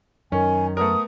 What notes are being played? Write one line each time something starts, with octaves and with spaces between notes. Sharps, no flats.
F#2 D#3 C#4 G#5
A3 B3 A#4 D#6